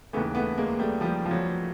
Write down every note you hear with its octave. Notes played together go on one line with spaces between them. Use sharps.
D#2 C#3 E3 A3 B3
A3 B3
G#3 A#3
G3 A3
F3 G3
F3
F#3